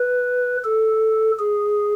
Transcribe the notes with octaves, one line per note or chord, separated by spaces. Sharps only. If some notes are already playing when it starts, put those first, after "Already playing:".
Already playing: B4
A4
G#4